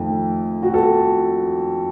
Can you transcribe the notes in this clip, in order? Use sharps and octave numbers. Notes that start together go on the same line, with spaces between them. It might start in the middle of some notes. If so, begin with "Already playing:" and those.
Already playing: F2 D#3 A3
F#4
A4